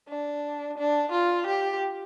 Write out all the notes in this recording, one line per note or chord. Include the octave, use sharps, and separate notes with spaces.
D4
D4
F4
G4